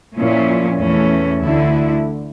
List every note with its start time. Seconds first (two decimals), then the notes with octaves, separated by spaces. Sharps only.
0.17 A#2 F3 C#4 E4
0.80 E2 E3 A3 C#4
1.42 D2 D3 A3 E4